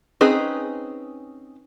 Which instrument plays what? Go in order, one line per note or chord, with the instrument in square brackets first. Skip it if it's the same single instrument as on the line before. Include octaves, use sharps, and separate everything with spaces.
[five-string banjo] C4 C#4 D#4 G#4 B4